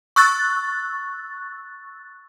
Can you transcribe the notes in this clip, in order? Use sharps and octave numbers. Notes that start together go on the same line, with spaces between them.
C#6 E6 F#6 A6